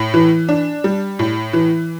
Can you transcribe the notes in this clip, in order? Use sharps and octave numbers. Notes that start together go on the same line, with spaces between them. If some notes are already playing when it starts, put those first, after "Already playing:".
Already playing: A2
E3
D4
G3
A2
E3